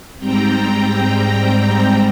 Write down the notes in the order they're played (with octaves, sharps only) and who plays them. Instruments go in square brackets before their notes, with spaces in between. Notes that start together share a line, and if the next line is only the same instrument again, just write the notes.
[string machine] G#2 G3 C4 G5 A#5